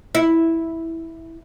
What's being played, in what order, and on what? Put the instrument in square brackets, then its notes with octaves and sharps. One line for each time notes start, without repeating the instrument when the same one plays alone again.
[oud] E4